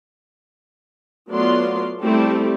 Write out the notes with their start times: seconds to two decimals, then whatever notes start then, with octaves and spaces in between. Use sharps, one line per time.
1.30 F#3 A3 B3 F4 D5 C6
2.00 G3 A3 C4 E4 G4 A4